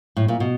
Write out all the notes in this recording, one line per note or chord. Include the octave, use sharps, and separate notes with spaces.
A2
A#2
B2